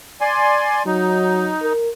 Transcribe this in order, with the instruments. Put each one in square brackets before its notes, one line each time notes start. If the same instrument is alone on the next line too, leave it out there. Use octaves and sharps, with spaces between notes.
[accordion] D5 G#5 C6
[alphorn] F#3 [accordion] D#4
[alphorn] A#4